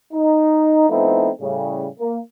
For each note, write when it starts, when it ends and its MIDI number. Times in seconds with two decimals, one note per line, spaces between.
0.13 0.90 63
0.90 1.30 53
0.90 1.30 57
0.90 1.30 59
0.90 1.30 60
0.90 1.30 63
0.90 1.30 64
1.41 1.87 45
1.41 1.87 49
1.41 1.87 55
2.00 2.20 58